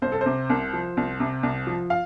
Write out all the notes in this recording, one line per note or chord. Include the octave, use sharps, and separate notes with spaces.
C2 C5
A4
C3 C5
C2
F3
C2
C3
C2
F3
F5